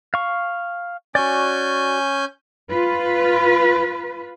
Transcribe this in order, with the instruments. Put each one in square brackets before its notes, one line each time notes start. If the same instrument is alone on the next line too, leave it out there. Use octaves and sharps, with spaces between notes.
[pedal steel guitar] F5 C#6
[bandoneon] C#4 G#5 G6 [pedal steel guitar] F#4 D5
[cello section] F4 B4